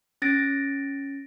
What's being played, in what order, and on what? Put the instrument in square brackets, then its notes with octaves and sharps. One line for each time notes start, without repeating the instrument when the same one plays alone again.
[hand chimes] C#4 A6 A#6 D7